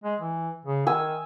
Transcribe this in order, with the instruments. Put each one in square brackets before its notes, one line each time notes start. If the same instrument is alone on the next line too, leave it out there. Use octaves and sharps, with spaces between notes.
[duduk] G#3
E3
C#3
[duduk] D#3 [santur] G#5 E6